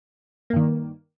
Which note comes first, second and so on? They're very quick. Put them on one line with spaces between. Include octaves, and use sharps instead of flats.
A#3 G2 D#3